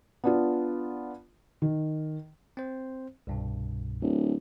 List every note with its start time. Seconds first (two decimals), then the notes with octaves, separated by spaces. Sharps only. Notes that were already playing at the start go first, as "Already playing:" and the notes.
0.24 B3 D4 F4
1.62 D#3
2.57 C4 C5
3.27 C2 G2 B2
4.01 D1